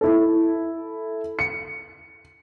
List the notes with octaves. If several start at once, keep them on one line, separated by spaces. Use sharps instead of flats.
E4 A4
C#7